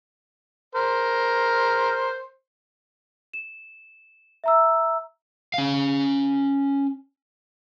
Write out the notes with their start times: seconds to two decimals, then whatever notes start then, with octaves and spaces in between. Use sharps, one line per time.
0.75 A#4 C5
3.34 E7
4.44 E5 A#5 E6
5.54 C#4 F5